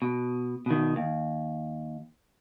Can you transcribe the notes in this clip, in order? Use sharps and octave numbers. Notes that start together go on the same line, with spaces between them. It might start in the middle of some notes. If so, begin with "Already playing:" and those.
B2
B2 D#3
D#2